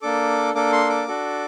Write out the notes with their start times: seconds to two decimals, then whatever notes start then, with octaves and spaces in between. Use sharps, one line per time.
0.02 A#3 D4 A4 D6
0.55 A#3 D4 A4 D6
0.72 C6
0.89 D6
1.08 D4 F#4 A4